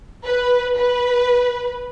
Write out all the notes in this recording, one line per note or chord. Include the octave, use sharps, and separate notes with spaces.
B4
B4